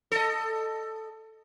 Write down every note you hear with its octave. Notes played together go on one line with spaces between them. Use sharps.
A4 D#5